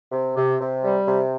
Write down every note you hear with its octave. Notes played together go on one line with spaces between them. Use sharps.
C3
C3
C3
G3
C3